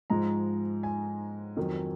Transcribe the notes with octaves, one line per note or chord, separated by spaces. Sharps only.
G#2 F3 G#3 A#5
G#5
F2 D#3 F#3